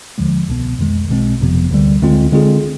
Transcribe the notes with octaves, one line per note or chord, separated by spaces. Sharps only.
D#2 D3 F3 G#3
C2 B2 B3
F2 D#3 G#3
B1 B2 G#3 C4
G1 F2 C3 F3 B3
D2 D3 G3
D2 D3 G#3 C4 F4
D3 G#3 C4 F4 G#4